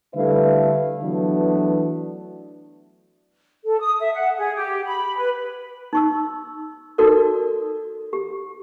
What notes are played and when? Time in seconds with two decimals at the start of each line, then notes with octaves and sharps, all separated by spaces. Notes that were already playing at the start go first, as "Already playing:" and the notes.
0.14 D3 G3 A3 E4 B4 F5
1.01 E3 F#3 A3 B3 D4
3.64 A4
3.79 D#6
3.99 E5
4.13 F#5
4.37 G#4
4.55 G4
4.86 B5
5.16 B4
5.93 D#4 C#6 E6
6.98 D#4 F#4 A4 A#4 D5
8.13 G4